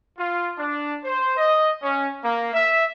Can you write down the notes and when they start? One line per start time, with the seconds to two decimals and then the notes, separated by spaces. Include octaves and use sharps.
0.18 F4
0.58 D4
1.04 C5
1.37 D#5
1.83 C#4
2.23 A#3
2.53 E5